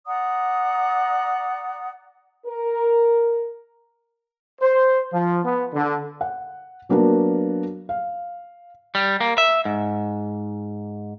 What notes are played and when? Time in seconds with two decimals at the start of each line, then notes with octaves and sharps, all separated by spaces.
0.07 D5 F#5 A#5 D#6
2.46 A#4
4.61 C5
5.11 F3
5.43 B3
5.73 D3
6.21 F#5
6.89 F#3 A#3 B3 D4 F#4
7.89 F5
8.95 G3
9.21 A#3
9.38 E5
9.65 G#2